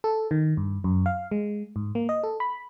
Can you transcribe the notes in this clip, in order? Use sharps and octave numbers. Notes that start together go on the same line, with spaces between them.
A4
D#3
G2
F#2
F5
G#3
G#2
A#3
D#5
A4
B5